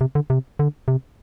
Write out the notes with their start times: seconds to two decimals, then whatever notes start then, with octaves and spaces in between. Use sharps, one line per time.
0.01 C3
0.15 D3
0.30 C3
0.59 D3
0.88 C3